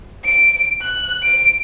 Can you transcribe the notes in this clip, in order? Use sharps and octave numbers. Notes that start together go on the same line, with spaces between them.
D7
F#6
D7